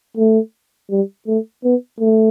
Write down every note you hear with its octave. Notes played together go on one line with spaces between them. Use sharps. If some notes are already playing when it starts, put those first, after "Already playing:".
A3
G3
A3
B3
A3